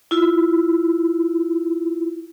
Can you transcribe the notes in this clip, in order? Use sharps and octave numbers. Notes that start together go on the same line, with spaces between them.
E4 F4